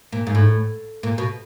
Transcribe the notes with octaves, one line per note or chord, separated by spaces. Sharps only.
A#2
G#2
A2
A#2
B2